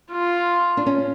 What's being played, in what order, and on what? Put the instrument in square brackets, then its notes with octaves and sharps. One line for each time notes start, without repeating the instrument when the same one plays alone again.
[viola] F4
[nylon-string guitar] D4
C#4